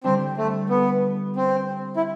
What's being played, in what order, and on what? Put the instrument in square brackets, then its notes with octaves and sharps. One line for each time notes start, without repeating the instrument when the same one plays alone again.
[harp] D3 G3 D4 [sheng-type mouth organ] C4
[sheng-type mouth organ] A3
B3
C4
E4